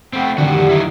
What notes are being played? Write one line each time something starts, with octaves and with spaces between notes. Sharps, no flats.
A3 C4 F#5 G5 B5
F2 A2 D3 D#3 F#4 G4 D5 F#5
F#3 D#4 E4